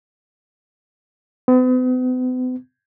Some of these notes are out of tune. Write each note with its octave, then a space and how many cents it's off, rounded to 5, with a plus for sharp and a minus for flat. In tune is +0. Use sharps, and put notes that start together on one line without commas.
B3 +45